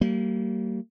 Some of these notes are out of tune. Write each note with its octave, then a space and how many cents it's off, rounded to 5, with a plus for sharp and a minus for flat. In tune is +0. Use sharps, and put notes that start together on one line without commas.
G3 -35 A#3 -30